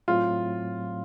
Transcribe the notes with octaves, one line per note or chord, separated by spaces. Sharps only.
A2 F#3 A3 C4 F4